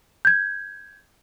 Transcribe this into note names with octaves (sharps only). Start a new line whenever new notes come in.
G6 G#6